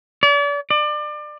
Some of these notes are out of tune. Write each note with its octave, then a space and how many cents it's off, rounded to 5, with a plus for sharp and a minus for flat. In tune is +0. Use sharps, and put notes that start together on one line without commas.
D5 -40
D5 +30